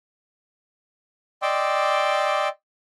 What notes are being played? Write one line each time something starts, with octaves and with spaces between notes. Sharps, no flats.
D5 D#5 G5 C6 D6 E6